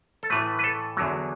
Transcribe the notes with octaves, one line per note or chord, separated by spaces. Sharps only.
A4
A2 E3 A3 B4
B4
A4
E2 D3 F#3